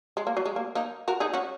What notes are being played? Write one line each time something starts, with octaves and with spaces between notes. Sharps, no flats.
G#3
A#3
F#3
G#3
A#3
A#3 D#4
F#4 A#4
D#4 G#4
C#4 F#4